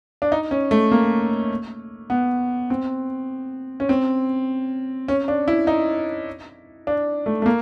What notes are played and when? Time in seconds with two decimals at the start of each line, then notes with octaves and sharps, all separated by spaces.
0.22 D4
0.32 D#4
0.51 C#4
0.71 A3
0.92 A#3
2.10 B3
2.70 C4
3.80 C#4
3.89 C4
5.08 C#4
5.28 D4
5.48 E4
5.67 D#4
6.87 D4
7.26 A3
7.42 A3
7.46 A#3